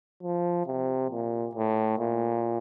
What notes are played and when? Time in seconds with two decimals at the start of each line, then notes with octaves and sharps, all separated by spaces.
0.23 F3
0.67 C3
1.10 A#2
1.55 A2
1.99 A#2